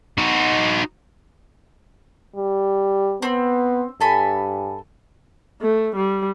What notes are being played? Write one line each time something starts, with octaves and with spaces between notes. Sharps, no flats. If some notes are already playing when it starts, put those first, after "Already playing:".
D#4 F#4
G3
B3 C4
G2 A4 G#5 B5
A3
G3